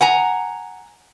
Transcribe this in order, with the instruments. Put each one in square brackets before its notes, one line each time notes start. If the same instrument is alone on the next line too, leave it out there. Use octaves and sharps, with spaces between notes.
[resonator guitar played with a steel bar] F#5 G#5 A#5